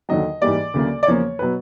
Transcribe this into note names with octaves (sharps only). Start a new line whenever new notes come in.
D#2 D3 F#3 D#5
G#2 E3 G3 A#3 D5
D2 C#3 F#3 A#3
D5
E2 C#3 F3 A#3 C#5
B2 F#3 B4